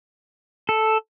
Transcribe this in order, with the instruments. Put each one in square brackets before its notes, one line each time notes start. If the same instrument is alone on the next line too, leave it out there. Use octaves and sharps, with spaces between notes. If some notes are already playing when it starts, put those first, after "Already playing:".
[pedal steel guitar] A4